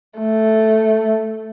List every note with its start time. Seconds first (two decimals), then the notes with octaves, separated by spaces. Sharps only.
0.19 A3